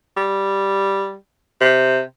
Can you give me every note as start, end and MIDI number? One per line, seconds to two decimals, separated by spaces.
0.16 1.15 55
1.61 2.01 48